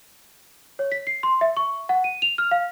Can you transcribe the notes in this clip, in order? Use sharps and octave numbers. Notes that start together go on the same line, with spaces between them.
C#5
B6
C7
C6
E5
C#6
F#5
D#7
F7
F6
F5